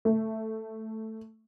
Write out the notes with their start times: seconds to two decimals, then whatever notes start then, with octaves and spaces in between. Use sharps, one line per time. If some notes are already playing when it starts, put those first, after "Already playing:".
0.05 A3